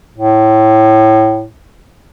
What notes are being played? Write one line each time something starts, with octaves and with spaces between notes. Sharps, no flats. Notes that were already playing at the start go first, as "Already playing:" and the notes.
A2